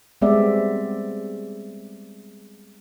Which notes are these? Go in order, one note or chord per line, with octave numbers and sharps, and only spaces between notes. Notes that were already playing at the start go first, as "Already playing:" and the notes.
G3 G#3 B3 C4 D5 E5